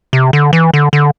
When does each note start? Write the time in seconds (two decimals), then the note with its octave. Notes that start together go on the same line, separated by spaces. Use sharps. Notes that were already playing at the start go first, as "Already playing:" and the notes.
0.13 C3
0.33 D3
0.53 E3
0.74 D3
0.93 D3